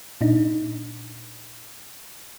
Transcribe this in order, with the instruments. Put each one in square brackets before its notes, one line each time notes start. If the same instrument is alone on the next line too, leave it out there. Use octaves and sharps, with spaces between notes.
[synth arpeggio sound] A#2 D4 D#4